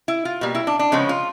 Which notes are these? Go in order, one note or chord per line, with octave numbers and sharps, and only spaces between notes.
E4
F4
B2 G3 A#3
E4
D4
D4
C#3 F3 G#3 B3 C#4
F4